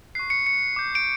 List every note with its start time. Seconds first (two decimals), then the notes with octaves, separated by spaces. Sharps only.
0.15 C#6 F#6 C7
0.30 C#7
0.47 C#7
0.76 D6 G6
0.95 D7